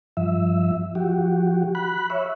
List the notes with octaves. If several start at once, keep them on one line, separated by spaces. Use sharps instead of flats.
G2 F3 E5
F3 F#4 G4
B5 F#6
C#5 E5